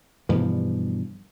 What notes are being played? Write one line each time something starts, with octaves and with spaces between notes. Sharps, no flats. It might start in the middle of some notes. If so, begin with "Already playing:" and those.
G2 B2 E3 F3